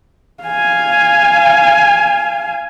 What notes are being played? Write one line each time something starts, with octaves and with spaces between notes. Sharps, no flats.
F5 G#5